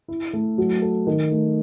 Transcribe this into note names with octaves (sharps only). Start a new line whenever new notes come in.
E4
A3
F#3
A4
D#3
A3